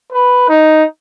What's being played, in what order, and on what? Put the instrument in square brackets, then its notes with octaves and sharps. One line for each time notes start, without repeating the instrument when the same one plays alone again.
[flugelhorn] B4
D#4